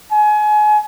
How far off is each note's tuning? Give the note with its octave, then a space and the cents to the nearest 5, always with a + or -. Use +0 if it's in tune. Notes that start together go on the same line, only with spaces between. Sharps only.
G#5 +30